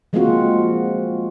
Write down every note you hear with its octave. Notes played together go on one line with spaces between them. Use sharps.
F3 G#3 A#3 C4 F4 F#4